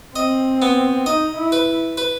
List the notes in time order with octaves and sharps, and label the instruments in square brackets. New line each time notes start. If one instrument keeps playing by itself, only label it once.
[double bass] C4 [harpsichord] D#5
[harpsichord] B3
[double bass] D#4 [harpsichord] D#5
[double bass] E4
[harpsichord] B4
B4